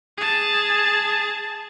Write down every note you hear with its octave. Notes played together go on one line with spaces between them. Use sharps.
G#4 A5